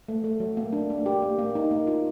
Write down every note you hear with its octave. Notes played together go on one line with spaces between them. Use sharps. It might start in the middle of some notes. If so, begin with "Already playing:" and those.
A3
A3
F#3
A#3
D4
A#3
G4
A#3
A#3
D#4
A#3
F4